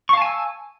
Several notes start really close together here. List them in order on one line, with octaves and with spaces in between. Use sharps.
C#6 F5 A5 G#5 E6